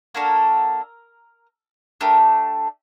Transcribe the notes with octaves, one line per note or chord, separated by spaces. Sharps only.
A#3 D4 F#4 A4 A#4
A3 D4 G4 A#4